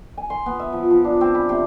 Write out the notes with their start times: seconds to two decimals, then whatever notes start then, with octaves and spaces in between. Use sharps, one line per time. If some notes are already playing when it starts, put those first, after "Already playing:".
0.17 G#5
0.30 C6
0.46 B3
0.59 E5
0.72 F3
0.90 F3
1.04 D4
1.21 C4
1.35 B5
1.49 C3